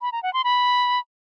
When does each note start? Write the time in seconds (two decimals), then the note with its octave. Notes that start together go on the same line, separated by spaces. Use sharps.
0.02 B5
0.12 A#5
0.23 F#5
0.33 C6
0.44 B5